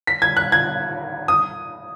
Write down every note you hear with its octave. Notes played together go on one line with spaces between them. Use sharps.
B6
G#6
F#6
G#6
D#6